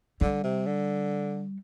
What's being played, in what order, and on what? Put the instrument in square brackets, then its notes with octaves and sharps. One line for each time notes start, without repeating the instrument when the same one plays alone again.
[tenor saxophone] D3 [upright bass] G3
[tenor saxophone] C3
D3